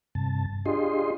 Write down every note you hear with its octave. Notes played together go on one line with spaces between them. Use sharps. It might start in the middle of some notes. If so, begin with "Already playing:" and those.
G2 C3 A5
D4 F4 G4 G#4 D#5 C6